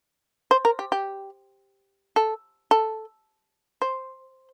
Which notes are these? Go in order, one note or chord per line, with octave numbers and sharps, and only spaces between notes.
C5
A#4
G4
G4
A4
A4
C5